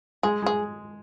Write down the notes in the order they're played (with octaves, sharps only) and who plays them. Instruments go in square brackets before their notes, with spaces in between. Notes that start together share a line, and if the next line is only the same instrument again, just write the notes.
[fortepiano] G#3 [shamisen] G#4
[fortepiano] G#3 [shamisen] G#4